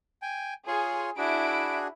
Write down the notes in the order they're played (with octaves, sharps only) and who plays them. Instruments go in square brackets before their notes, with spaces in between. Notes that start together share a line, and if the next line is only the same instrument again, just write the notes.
[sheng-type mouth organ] G5 G#5
[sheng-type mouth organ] F4 C#5 C6 [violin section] G#4
[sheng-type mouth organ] D4 F#4 G#4 [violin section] E4 D7